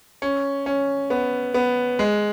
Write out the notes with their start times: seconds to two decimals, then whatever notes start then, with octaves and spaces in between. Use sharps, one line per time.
0.22 C#4
0.66 C#4
1.10 B3
1.54 B3
1.99 G#3